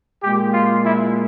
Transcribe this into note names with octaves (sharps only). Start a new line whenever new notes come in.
A#2 G#3 G4
F4
E4